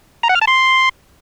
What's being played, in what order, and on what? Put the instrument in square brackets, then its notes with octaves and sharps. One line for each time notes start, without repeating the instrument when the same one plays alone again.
[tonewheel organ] A#5
F#5
F6
A5
C6